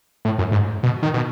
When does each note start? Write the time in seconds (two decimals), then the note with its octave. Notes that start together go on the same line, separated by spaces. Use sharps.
0.25 A2
0.38 F#2
0.51 G#2
0.83 B2
1.03 D#3
1.14 B2